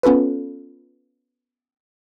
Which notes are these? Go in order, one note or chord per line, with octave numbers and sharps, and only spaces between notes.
B3 C#4 F4 A4 B4